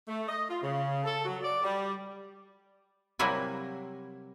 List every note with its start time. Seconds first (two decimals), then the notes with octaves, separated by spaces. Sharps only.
0.07 A3
0.28 D#5
0.49 F4
0.62 C#3
1.04 A4
1.25 F#3
1.42 D5
1.63 G3
3.19 C3 F#3 G3 A#3 E4 G#5